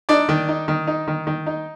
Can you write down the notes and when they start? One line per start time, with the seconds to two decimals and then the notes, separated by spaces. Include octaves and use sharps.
0.09 D4 D#4 D5
0.29 D#3
0.48 D#4
0.68 D#3
0.87 D#4
1.07 D#3
1.27 D#3
1.46 D#4